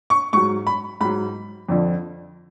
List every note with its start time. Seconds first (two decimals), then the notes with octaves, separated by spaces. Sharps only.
0.10 C#6
0.33 G#2 F#3 C#6
0.67 B5
1.01 G#2 F#3 B5
1.69 F2 D3 F3